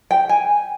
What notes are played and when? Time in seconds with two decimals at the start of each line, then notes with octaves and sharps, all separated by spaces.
0.11 G5
0.29 G#5